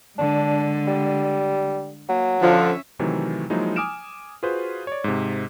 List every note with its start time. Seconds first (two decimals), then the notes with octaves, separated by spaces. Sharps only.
0.18 D3 G#3 D4
0.87 G3
2.09 F#3 A#3
2.41 D3 F3 C#4 E5
2.99 C3 D#3 E3 F#3 A3
3.50 F3 F#3 G#3 A#3 D#4 E4
3.76 G#5 D6 D#6 F6 D7 E7
4.43 F4 F#4 G#4 B4 C5
4.87 C#5 D5
5.04 G#2 C3